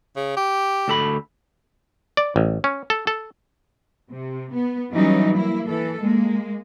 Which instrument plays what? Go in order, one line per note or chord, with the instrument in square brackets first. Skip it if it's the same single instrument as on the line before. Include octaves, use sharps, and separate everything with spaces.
[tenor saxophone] C#3
G4
[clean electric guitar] D2 A4 B5
[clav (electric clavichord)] D5
A1
C#4
A4
A4
[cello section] C3
B3
E3 F#3 G3 C#4 D#4
A#3 E4
E3 A4
G#3 A#3